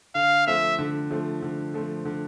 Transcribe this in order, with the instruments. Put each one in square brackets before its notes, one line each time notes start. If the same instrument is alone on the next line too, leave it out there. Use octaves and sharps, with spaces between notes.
[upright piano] D3 [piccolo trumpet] F5
[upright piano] F3 A3 C4 [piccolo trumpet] E5
[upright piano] D3
F3 A3 C4
D3
F3 A3 C4
D3